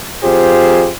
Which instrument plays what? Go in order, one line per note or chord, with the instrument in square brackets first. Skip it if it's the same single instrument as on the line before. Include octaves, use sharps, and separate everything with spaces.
[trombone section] F2 F4 G4 G#4 C5